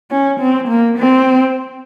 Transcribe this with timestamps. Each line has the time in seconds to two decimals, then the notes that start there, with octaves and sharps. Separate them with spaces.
0.11 C#4
0.40 C4
0.68 A#3
0.98 C4